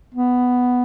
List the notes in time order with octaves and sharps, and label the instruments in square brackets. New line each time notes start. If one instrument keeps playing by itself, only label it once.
[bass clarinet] B3